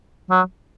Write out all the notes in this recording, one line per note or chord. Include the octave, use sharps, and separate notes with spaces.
F#3